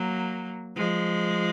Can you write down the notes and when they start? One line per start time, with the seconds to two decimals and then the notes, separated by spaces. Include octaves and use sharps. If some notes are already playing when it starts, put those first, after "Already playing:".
Already playing: F#3 A#3
0.76 F3 G#3